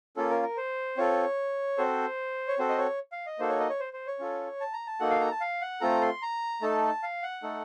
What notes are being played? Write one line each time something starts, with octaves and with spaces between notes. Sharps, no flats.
A#3 C#4 F4 A4
A#4
A#4
C5
C4 F4 A4 C#5
C4 F#4 A4 C5
C#5
C4 F#4 A4 C5
D#5
C#5
F5
D#5
A#3 D#4 F#4 A4 C5
C#5
D#5
C#5
C5
C5
C#5
C#4 F4 A4
A5
A#5
A5
A#3 D#4 F#4 A4 F#5
F5
A#5
A5
F5
F#5
A3 C4 F4 A4 A#5
C6
A#5
A3 D#4 A4 A5
F5
F#5
A3 D#4 A4